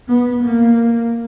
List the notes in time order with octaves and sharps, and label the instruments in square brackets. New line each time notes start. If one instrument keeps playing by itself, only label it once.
[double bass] B3
A#3